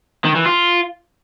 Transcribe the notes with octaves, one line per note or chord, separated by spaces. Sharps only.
D#3
E3
F4